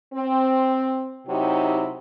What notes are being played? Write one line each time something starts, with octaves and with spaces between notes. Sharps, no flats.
C4
C3 F#3 D#4 E4 G4